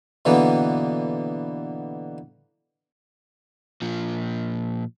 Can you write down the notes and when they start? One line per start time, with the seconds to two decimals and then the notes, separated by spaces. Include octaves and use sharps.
0.25 B2 D3 E3 A#3 B3
3.82 A#2 F3